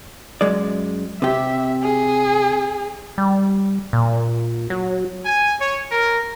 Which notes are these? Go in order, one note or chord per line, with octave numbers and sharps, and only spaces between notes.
F#2 G#3 D5
C3 G4 E5
G#4
G3
A#2
F#3
G#5
C#5
A#4